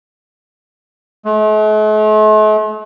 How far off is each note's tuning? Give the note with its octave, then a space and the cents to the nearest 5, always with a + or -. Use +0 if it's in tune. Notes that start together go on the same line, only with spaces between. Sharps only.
A3 -45